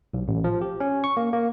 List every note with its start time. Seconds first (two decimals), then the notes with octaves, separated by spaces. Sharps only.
0.14 B1
0.28 A1
0.44 F3
0.62 G4
0.80 C#4
1.04 C#6
1.17 A#3
1.33 A#3